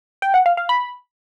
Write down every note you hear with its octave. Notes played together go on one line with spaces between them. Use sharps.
G5
F#5
F5
F5
B5